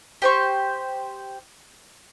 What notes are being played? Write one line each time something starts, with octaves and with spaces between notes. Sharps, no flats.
G4 C5 C#6